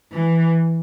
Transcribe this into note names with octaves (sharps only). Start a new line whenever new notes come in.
E3